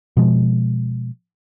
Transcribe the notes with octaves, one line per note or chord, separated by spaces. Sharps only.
B2 F3 G#3